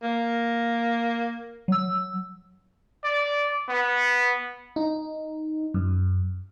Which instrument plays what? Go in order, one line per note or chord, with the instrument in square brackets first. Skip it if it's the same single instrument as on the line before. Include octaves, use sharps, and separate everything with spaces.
[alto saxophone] A#3
[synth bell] F#3 E6
[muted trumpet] D5
B3
[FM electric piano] D#4
F#2